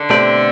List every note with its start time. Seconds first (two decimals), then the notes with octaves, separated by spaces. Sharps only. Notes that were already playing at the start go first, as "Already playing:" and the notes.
Already playing: D3
0.10 B2 A3 C4 G4 D5